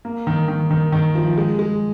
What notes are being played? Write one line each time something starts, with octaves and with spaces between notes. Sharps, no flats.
A#3
D#3
D#3
D#3
D#3
F3
G#3
G#3